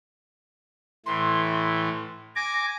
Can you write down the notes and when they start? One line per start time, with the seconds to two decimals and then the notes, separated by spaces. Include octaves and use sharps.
1.06 A2 E3 C6
2.36 G#5 D6 A#6